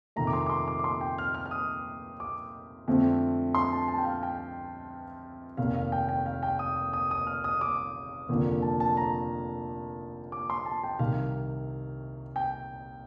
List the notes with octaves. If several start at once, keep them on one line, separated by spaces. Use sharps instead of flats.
F2 C3 D#3 A3 A#5
D6
C6
D6
C6
D6
D6
C6
G5
F6
F6
F6
D#6
D6
F2 D3 A3 C4
C6
A5
A5
G5
F5
G5
F1 D#2 D#3 F5
F5
G5
G5
F5
G5
D#6
D#6
D#6
D#6
F6
D#6
D6
F1 D#2 D3 F3 A#3
A5
A5
A#5
D6
C6
A5
G5
C2 C3 D#3 F5
G5